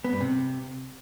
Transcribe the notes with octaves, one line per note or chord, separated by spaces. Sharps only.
B3
G2
C3